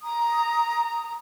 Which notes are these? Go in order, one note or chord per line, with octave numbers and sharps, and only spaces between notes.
A#5 D#6